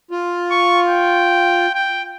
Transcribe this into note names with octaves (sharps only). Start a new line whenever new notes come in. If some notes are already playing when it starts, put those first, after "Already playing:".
F4
C#6
G5
G5